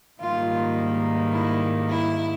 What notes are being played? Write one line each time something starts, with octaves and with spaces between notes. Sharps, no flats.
G#2 D#3 G3 A#3 F4
E4
E4